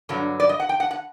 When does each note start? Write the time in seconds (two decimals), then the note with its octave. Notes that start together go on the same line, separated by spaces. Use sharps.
0.09 G2 D3 F#3
0.40 D5
0.49 D#5
0.60 F#5
0.69 G5
0.80 F#5
0.91 F#5